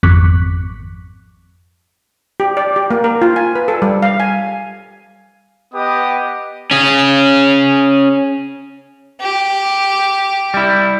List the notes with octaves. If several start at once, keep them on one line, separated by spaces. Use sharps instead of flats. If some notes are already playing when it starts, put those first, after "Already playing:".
G#1 F2 C#6 D6 F#6 B6
G4
D5
G4
A#3
A#4
F4
G#5
B4
A4
G3
F5
G#5
B3 G4 B4 D#5 D#6
C#4 G#4
G4
G3 E4